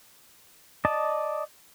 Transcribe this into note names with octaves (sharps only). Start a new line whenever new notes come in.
D5 D#5 A5